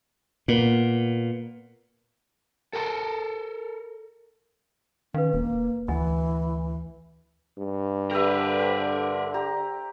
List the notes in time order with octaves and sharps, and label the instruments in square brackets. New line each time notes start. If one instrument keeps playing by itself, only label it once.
[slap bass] A#2 [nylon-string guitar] A#3 B3
[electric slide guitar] A4 A#4 G5 A5
[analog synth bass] D#3 [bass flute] C#4 [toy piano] B4 F5
[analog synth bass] E1 [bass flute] A#3
[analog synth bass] D2 [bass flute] E3 [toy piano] D#5 F#5 G#5
[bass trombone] G2
[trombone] D3 [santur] G4 E5 [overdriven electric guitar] A#4 B4
[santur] C5
G4 A#5